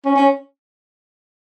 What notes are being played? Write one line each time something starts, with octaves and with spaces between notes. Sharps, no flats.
C#4
C#4